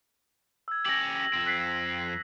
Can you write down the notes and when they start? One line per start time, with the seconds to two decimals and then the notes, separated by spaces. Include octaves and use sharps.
0.68 E6 G#6
0.85 C#4 G4 A#6 F#7
1.33 F2 C4
1.46 F#6 B6 C7